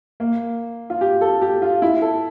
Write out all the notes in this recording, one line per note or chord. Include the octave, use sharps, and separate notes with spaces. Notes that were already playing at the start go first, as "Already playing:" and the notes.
A#3
F4
G4
A4
G4
F4
E4
A4